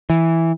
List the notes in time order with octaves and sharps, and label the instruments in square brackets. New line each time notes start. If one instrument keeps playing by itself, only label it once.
[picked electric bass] E3